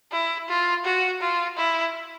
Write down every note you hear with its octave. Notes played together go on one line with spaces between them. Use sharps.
E4
F4
F#4
F4
E4